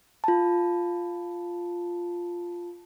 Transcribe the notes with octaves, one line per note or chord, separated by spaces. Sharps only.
F4 A5